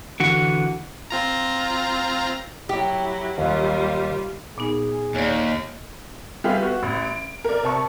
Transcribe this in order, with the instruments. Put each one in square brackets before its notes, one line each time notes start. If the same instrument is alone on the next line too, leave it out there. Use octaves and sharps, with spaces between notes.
[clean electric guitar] D3 E3 F#4
[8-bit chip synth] C4 F4 A#5
[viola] F#3 E4 [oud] G4
[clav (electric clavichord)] D#2 F#3 [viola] G3 F4
[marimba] A#2 B3 D#4 [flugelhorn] G#4
[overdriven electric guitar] D#2 [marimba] C#5 D5
[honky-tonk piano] G3 F4 G4 G#4 B4 E5
B3 F#4
A1
D7
A#4 D5
C3 A5 C#6